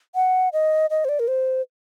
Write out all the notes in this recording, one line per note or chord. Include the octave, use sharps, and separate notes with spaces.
F#5
D#5
D#5
C5
D5
A#4
C5